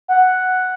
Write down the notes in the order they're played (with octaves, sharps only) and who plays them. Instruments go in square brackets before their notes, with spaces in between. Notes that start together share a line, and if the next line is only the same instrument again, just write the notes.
[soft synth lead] F#5